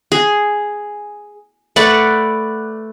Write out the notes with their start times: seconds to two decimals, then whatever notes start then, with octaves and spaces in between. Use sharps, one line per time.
0.12 G#4
1.76 A3 B4 D5 F#5